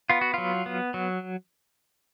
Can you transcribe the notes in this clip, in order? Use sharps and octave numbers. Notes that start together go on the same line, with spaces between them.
B3 F4
F#4
F#3 F4
B3
F#3